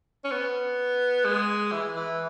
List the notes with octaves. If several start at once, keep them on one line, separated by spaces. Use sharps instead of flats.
C#4
B3
G#3
E3
E3